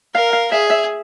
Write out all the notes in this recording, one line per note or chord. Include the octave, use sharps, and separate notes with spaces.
A#4 F5
F5
G#4 E5
E5